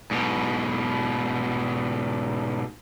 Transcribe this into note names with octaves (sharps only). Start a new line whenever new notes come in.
G#2 B2